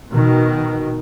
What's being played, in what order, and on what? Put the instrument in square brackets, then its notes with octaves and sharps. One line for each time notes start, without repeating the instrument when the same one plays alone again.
[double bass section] B2 D#3